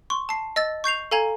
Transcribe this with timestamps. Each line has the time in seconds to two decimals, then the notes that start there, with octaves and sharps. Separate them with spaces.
0.10 C6 C#6
0.29 A5 C7
0.56 D#5 E6 A6
0.84 C#6 G6 C7 F7
1.11 A4 F5 G#5 A#5 G#6